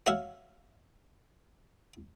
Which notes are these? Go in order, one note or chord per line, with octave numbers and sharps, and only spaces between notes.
F#4 C#5 E5 F5